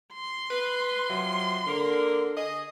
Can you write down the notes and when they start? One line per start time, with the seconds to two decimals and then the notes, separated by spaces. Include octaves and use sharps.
0.13 C6
0.51 B4
1.09 C3 F3 F#3
1.67 D3 A#3 A#4
2.37 G#4 D#5